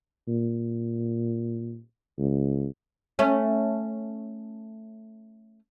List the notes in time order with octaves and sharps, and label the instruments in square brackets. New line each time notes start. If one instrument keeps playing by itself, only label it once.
[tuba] A#2
C#2
[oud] A3 C#4